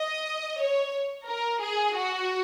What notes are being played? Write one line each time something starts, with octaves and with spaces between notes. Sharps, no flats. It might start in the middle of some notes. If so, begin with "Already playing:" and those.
Already playing: D#5
C#5
A#4
G#4
F#4